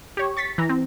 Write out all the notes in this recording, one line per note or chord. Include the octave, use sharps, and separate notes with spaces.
G4 C#5
C#6 A6 B6
E3 A#5
C4